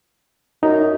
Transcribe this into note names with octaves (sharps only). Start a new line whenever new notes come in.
F#2 D#4